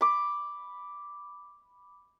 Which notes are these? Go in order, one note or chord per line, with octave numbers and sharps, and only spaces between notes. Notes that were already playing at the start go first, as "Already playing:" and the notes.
B5 D6